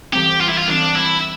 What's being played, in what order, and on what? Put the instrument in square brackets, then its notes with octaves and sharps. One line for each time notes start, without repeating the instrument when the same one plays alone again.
[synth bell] E3 G3 C4 [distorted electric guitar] G4
[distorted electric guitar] F4
E4
F4
[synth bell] E3 G3 C4 [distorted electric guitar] D4
[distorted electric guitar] E4